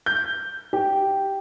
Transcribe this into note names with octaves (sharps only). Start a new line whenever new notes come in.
G6
G4